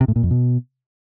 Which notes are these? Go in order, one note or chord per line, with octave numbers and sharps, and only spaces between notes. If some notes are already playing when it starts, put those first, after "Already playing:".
C3
A2
A#2
F2
B2